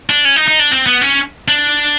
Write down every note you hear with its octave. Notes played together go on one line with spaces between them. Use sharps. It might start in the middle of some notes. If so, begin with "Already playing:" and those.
D4
C#4
D#4
D#4
D4
C4
B3
C#4
D4